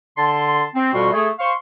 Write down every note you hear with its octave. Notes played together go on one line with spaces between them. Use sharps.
D3 A5 C6
C4
F2 B2 G3 F#4 C6 C#6
A3 G#4
C5 F5 C6 C#6